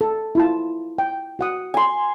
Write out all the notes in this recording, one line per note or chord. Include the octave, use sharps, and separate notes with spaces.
A4
E4 F4 A5
G5
F#4 F#5 D#6
G#5 C6